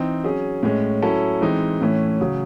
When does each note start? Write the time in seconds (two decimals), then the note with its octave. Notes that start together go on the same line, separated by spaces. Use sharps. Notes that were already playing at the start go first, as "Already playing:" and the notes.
Already playing: E3 C4 D#4
0.24 F#3 C#4 G#4
0.63 A2 G#3 C#4
1.02 F#3 C#4 E4 A4
1.41 E3 G#3 C4 D#4
1.81 A2 E3 A3 C#4
2.20 C#3 F#3